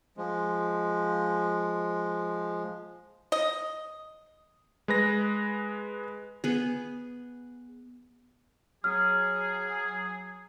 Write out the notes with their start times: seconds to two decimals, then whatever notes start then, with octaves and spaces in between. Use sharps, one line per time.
0.17 F3 G#3
3.32 D#5
4.88 G#3 B4 A#6
6.44 B3 G#4
8.84 F#3 G#4 F6